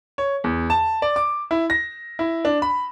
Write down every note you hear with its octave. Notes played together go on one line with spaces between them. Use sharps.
C#5
E2
A5
D5
D6
E4
A#6
E4
D4
B5